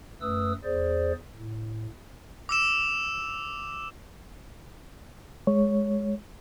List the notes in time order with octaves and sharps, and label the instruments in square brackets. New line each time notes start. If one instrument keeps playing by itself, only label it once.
[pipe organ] F#2 A3 B4 D#6 E6
E2 G#4 C5 D5
A2
[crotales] D6 E6 E7
[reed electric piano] G#3 C#5